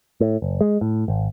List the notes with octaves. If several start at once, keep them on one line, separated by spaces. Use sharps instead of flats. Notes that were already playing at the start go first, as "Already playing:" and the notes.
A2
F#1
G#3
A2
G#1